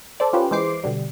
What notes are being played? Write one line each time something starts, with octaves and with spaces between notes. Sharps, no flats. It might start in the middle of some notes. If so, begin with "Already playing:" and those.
A4 C5 D5
C#4 F4 G4 B4 C5
E3 G#3 C5 D6 C7
B2 D3 G3